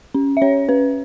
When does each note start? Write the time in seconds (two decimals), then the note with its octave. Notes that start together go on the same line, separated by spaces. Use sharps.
0.14 C#4
0.37 E5
0.42 C#4 C#5
0.69 C#4 B4